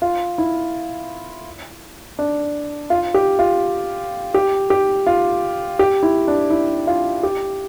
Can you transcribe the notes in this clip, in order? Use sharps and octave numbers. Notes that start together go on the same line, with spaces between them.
F4
E4
D4
F4
G4
F4
G4
G4
F4
G4
E4
D4
E4
F4
G4